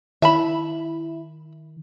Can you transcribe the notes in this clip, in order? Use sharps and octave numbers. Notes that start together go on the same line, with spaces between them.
D#3 E4 E5 A5 B5